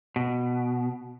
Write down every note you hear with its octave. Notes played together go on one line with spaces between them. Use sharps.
B2